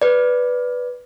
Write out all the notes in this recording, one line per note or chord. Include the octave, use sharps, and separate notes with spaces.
B4 D5